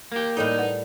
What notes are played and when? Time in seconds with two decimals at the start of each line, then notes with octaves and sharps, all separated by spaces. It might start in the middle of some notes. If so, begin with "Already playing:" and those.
0.12 A#3 G4
0.37 A2 G3 D#4 A4 C#5 D#5 G5
0.58 A#4 B4 F#5